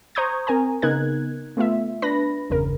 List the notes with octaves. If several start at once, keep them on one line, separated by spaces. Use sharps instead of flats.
C5 A#5 C#6 D#6 G6 G#6
C4 A#4 G#5 A#5
C#3 B3 D#4 A#4 F#6 G#6
A3 B3 F4 E5
D4 B4 B5 A#6
G1 E2 C#3 A#4